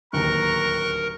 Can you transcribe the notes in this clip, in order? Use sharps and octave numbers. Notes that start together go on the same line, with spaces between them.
D1 D#2 A#4 A#5 C#6 F#6